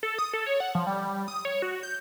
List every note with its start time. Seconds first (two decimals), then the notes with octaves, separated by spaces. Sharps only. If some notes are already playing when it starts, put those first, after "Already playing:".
0.03 A4
0.19 D#6
0.33 A4
0.46 C#5
0.60 F#5
0.75 F3
0.87 G3
1.05 G3
1.28 D#6
1.45 C#5
1.62 F#4
1.83 G6